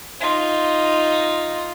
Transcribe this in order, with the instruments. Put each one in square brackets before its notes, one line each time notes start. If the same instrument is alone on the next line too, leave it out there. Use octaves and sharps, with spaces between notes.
[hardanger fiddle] D#4 F4